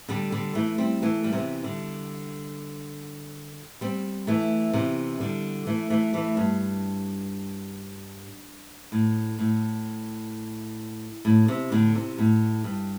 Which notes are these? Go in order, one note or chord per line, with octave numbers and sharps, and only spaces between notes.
D3 G3
D3 G3
E3 A3
G3 C4
E3 A3
G3
C3 E3
D3 G3
G3 C4
E3 A3
C3 E3
D3 G3
E3 A3
E3 A3
E3 A3
G2
A2
A2
A2
C3
A2 D3
C3
A2
G2